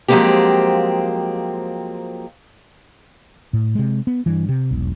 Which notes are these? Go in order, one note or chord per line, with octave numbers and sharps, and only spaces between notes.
F3 F#3 G#3 A#3 C4 G4
A2
C3 G#3
B3
G2 E3
C3
E1 B1